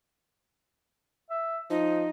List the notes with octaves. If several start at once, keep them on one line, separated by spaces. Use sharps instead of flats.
E5
F3 D#4 D#5